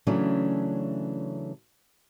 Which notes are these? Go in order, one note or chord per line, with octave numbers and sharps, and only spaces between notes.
C#3 E3 F#3 A3 C#4 D4